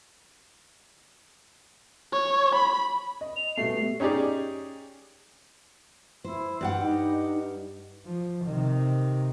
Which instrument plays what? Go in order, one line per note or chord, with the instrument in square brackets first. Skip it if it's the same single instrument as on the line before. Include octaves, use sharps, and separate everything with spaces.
[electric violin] C#5
B5
[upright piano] D#5
[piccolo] F7
[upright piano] B2 G3 A3 [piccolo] C7
[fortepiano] C#4 D#4 G4 G#4 D5
[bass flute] E4 [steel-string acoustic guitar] C5
[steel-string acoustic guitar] G2 G4 F#5
[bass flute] D#4
[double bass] F3
C3 D#3